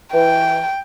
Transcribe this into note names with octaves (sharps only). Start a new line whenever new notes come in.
E3 G5